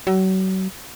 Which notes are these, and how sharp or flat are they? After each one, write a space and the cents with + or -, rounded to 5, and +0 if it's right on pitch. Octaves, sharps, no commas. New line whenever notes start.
F#3 +35